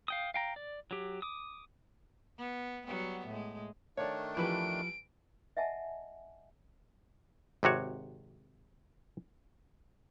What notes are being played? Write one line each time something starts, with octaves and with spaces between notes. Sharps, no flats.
F5 G5 D#6
F5 G5 A#5
D5
F#3 G4
D6 D#6
B3
F#3 G3 B3
A2 G#3
D#3 A3 D4 C#5 D5
E3 F3 G4 B4 D7
D#5 E5 F#5 G#5 A5
G#1 C3 F#4 C#5